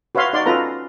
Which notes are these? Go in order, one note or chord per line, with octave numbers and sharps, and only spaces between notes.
F#4 B4 C#5 E5 F5 C6
D#4 F#4 D5 C6
C#4 F4 A4 B4 A#5